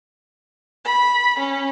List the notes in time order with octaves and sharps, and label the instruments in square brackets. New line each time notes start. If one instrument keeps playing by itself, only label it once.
[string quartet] B5
C#4